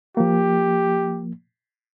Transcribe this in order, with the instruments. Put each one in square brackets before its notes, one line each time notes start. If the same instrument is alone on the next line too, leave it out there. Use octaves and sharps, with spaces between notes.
[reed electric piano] F3 A#3 [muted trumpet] G4